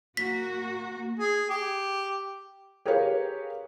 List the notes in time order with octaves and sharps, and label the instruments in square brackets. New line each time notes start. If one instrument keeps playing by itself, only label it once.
[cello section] A#3 F#4 [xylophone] B6
[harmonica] G#4
G4
[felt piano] G4 G#4 A#4 B4 C#5 F5